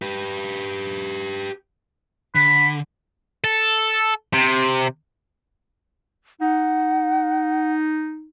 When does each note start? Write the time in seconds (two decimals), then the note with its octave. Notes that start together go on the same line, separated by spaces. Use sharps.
0.02 G4 B4
2.35 D3 B5
3.44 A4
4.33 C3
6.41 D#4 F#5